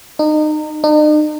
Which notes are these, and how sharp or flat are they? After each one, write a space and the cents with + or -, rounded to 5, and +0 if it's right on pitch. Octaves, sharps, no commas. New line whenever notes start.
D#4 -30
D#4 -45